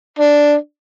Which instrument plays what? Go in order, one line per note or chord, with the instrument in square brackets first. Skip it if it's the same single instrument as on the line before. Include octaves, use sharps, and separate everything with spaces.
[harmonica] D4